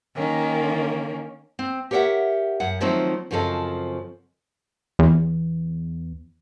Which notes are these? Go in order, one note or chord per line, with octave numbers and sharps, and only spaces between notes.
D#3 A#3 C#4
C4
G4 A#4 C#5 D#5 E5 F#5
F#2 F#5
D#3 F3 F#3 A3 C4 D#4
F#2 C#3 F3 C4 A4 D#5
E2